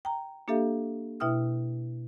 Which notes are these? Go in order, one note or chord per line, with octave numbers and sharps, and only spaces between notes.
G5 A#5
A#3 D4 G4 A4 E5 F5
B2 E4 E5 G5 D#6 F6